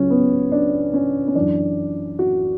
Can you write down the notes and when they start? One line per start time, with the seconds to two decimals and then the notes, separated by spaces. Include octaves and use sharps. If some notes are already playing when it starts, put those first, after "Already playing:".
Already playing: C#2 C#3 F#3 C#4
0.10 B3
0.52 D4
0.93 C#4
1.28 C#4
1.35 F#2 E3 D4
2.19 F#4